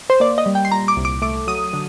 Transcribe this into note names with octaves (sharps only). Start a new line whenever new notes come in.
C5
A#3 D5
D#5
G3
G5
C6
A#2 A#5
D6
C2
D6
A3 D6
F#3 D#6
D3